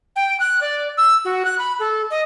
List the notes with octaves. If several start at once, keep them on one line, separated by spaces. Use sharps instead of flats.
G5
F#6
D5
E6
F#4
F#6
B5
A4
D#5